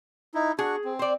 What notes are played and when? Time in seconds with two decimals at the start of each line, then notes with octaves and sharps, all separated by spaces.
0.34 D#4 E4
0.59 D4 F#4 G#4 C#6
0.85 C4
0.99 C5 D5